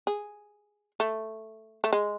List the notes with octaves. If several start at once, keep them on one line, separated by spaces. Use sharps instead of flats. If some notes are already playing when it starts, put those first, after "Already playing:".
G#4
A3
A3
G#3